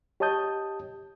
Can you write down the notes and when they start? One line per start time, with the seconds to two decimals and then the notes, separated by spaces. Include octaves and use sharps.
0.20 G4 C#5 D#5 A5 D#6 G6